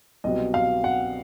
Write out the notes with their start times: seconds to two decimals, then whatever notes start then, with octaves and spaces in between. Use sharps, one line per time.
0.24 C2 B2 F#3 D#5
0.54 F5
0.84 F#5